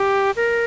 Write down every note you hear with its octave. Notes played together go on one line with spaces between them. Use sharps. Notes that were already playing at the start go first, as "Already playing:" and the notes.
Already playing: G4
A#4